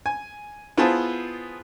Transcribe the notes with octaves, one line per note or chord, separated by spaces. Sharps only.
G#5
B3 E4 F4 G#4 C5 A5